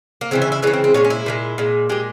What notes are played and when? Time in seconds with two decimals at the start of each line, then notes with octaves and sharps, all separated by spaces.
0.21 A#3
0.31 C#3 E3 G#3 C4
0.42 E4
0.52 E4
0.62 C#3 E3 G#3 C#4
0.73 C4
0.84 C4
0.94 A#2 F3 G#3 C#4
1.05 C#4
1.10 E4
1.26 A#2 F3 G#3
1.58 A#2 G#3
1.89 A#2 G#3 G4